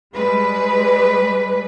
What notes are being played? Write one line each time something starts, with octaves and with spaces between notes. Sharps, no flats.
G3 G#3 B4